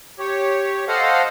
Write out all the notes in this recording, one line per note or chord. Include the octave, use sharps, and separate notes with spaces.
G4 C#5
A4 C5 D#5 F5 F#5